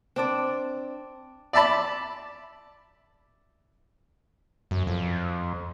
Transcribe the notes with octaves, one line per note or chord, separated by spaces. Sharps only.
C4 D4 D5
D5 E5 A5 B5
F#2
F2